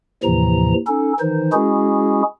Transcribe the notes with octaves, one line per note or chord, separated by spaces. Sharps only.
D#2 A2 C3 E3 F3 A#5
C#4 D#4 A4
D#3 E3 D#4 C5
G#3 C#4 E4 F#4 G#4